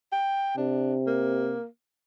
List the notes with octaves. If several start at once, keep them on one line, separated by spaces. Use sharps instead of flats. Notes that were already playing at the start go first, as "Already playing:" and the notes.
G5
C3 D4
A#3